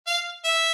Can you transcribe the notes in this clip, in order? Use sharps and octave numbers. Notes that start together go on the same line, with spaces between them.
F5
E5